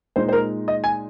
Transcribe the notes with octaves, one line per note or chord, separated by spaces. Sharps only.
A#2 G#3 D#4 C5
C5
A#4
D#5
G#5